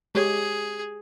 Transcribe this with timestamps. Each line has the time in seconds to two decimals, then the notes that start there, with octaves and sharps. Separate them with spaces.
0.15 G#3 G4 G#4 C#5